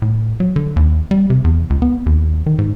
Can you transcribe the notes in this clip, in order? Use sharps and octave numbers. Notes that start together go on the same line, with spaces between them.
A2
F#3
D3
D#2
G3
C3
E2
C#2
B3
D#2
D#3
G#2